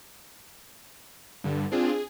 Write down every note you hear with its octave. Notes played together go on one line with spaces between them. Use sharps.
G2 D3
C4 D4 F4 G#4
G#4